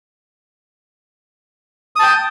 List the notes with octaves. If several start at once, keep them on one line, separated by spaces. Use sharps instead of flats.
G5 A5 D#6